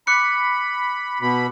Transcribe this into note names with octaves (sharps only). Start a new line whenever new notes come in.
B5 D6 F#6 C#7
B2 B5